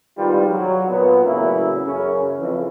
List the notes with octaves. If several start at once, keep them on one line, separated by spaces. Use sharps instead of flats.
C2 G#2 D#3 G3 F4 B4
F#3
A#2 B3
E2 A2 C#3 F#3 A#3 E4
F#2 C#3 C#4
F2 C#3 E3